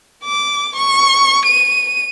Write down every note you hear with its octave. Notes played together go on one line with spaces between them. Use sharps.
D6
C#6
D#7